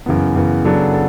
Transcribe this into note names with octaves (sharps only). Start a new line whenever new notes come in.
F#2 C#3 E3 B3
F#2 C#3 E3 B3
C#3 F#3 B3 D4 A4
A4